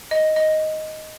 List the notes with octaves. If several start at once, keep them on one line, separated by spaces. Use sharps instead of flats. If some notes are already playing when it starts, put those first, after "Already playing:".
D#5
D#5